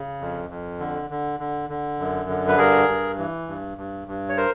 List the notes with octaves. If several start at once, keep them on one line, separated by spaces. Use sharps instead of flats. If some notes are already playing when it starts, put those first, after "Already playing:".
Already playing: C#3
F2
F2
D3
D3
D3
D3
F#2
D3
B4
G2 G#4 A#4
G2
E3
G2
G2
G2
C#5
A#4 C5